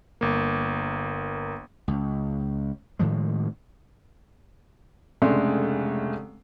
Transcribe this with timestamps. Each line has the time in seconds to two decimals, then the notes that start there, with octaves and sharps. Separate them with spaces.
0.21 G1 A#3
1.88 C#2
2.99 A2 D#3 F3 G#3
5.22 F1 C#3 G#3 A3 D4 C6